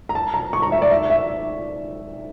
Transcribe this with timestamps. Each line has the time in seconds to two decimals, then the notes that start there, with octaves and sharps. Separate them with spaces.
0.09 A#5
0.15 A5
0.34 A#5
0.53 C#6
0.62 A#5
0.72 E5
0.82 D5
0.91 E5
1.10 E5